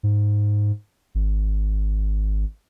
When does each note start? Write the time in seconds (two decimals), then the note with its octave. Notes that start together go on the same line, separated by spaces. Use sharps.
0.03 G#2
1.15 G#1